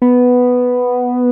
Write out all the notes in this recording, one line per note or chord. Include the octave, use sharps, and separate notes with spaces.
B3